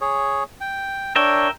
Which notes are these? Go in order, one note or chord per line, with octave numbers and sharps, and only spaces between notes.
G#4 C#5
G5
D4 A#4 C#5 E5 G5